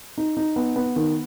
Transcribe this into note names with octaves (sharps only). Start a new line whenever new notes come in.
D#4
D#4
B3
B3
D#3